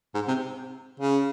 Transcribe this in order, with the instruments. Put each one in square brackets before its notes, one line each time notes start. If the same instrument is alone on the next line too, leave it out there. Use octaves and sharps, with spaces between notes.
[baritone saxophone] G#2
C3
C#3